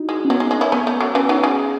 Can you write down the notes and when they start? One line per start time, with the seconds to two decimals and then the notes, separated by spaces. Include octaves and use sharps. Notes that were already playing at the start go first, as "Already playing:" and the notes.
Already playing: D#4 E4 F#4
0.09 G#3
0.25 C#4
0.30 F#3 B3
0.40 G#3
0.51 G#3
0.61 C#4 E4
0.72 A3 B3 C#4
0.87 A3
1.01 F#3
1.15 E3 C#4
1.29 F#3 D#4
1.43 G#3 G#4